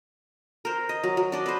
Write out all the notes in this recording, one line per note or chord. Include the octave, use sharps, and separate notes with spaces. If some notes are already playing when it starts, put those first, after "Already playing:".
A#4 C5
D#5
F#3
F#3
D4 D5 D#5
B4 C5